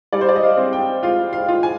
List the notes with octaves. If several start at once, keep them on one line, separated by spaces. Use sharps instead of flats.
G3 D5
C5
D5
D#5
F5
C4
G5
F4 F5
F5
F4
G#5